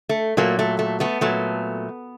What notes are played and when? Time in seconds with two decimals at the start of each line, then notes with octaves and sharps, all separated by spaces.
0.09 A3
0.37 A#2 F#3 A3 A#3
0.59 A3
0.79 A3
1.00 A3 B3
1.21 A#2 F#3 A3